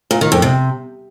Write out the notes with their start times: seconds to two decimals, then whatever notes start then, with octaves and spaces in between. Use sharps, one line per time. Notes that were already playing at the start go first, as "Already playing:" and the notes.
0.11 A#2
0.21 D#3
0.32 F2
0.42 C3